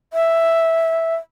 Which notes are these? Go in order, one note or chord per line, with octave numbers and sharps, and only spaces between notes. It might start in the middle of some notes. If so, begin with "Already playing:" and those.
E5